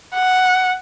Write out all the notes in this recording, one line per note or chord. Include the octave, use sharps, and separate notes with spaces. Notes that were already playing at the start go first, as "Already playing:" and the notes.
F#5